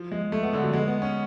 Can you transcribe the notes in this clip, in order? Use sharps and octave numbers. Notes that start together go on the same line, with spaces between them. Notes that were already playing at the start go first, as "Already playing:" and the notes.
Already playing: F3
G#3
A3
B3
D3
F#3
G#3
B3
C#4